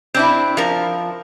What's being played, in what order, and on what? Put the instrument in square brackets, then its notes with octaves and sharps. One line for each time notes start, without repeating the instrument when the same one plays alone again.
[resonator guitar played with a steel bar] C4 D4 E4
F3 A#4